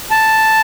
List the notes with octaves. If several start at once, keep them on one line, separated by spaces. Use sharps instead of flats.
A5